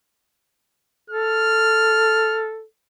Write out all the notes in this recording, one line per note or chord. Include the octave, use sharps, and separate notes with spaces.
A4 F6